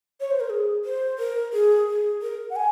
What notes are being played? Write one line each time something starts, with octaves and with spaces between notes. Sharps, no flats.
C#5
C5
A#4
G#4
C5
A#4
G#4
G#4
A#4
F#5
G#5